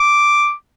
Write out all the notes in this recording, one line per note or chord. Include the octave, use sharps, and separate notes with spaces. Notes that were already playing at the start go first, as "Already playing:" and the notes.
Already playing: D6